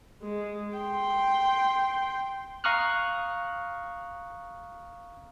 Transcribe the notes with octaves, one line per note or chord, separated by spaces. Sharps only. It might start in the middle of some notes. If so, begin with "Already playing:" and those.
G#3
G5 C6
F5 A#5 C#6 D#6 F6 F#6